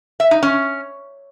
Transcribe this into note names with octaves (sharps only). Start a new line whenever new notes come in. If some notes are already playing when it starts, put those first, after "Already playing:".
E5
D#4
C#4